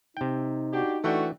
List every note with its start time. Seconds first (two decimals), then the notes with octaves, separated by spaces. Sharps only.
0.17 C3 D#4 G5
0.73 D4 F#4 G4
1.04 E3 A3 D4 F#4 G5